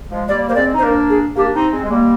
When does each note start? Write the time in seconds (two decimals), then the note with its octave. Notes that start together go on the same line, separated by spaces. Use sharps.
0.11 F3 G#3
0.28 G3 A#3 D5
0.49 A#3 C5
0.55 G#3 C4 D5
0.75 D#4
0.78 C5
0.82 A#3 D4 A#4
1.09 G#4
1.36 A#3 D4 G4
1.54 C4 D#4
1.72 G#3 C4
1.83 G#3
1.90 G3 A#3